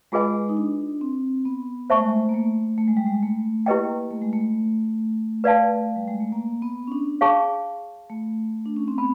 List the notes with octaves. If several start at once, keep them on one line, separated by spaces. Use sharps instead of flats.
G#3 F4 G#4 B4 D#5 G#5
D#4
D4
C4
B3
A3 C5 E5 A5 C#6
G#3
A3
A#3
A3
A3
G#3
G3
G#3
A3
A#3 E4 G4 B4 D#5 G5
A3
G#3
A3
B4 D5 F5 A5
G3
G#3
A3
A#3
B3
C#4
D4
G#4 C#5 F5 A5 C#6
A3
D4
C#4
C4
B3 B5